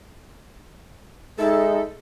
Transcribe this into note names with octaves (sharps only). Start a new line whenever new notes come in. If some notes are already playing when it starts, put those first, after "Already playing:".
G#3 D#4 A4 E5